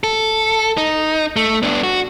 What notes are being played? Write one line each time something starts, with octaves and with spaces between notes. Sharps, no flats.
A4
D#4
A3
B3 D4
F#4